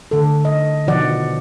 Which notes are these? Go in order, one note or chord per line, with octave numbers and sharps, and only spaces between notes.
D3 A4
D#5
B2 D#3 F3 F#4 D5 F#5